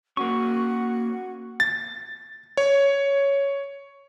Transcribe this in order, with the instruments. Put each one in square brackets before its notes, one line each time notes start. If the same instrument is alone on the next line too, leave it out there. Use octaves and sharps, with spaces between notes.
[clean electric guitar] A#3 C#4 [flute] F#4 [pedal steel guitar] C#6
[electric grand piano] A6
C#5